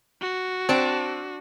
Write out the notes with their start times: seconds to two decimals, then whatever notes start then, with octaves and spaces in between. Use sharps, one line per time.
0.21 F#4
0.69 C4 D4 D5 A5